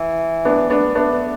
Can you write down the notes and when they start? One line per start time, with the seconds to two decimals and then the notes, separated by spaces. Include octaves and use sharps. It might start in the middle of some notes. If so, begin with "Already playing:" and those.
Already playing: E3
0.45 B3 D4
0.70 B3 D4
0.95 A3 B3 D4